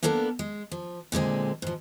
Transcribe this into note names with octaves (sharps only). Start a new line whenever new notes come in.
A#3 B3 D4 A4 A#4
G#3
F3
A#2 D3 G#3 C4
G#2 F3